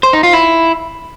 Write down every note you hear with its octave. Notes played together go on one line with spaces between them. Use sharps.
C5
D#4
F4
E4